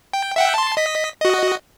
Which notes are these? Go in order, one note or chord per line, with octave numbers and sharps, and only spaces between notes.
G5
E5 F#5 G5
A5 C6
D#5 B6
F#4 D#5